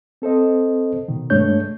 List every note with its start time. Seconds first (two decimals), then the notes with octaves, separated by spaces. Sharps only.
0.22 C4 A4 C5 D#5
1.08 B2 D#3
1.30 G2 G#3 A3 D4 C#5 G6